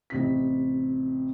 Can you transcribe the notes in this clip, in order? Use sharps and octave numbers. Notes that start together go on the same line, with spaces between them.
A1 C3 B6